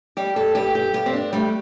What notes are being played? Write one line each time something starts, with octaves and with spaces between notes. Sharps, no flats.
G3 G4
A4
G2 G4
G4
G2 G4
C4
D4
G3 A3